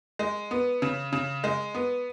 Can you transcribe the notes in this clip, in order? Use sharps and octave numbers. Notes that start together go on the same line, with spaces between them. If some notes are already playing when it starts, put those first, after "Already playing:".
G#3
B3
C#3
C#3
G#3
B3